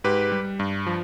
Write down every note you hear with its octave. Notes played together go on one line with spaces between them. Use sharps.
G#2 G4 B4
G3
G2
F3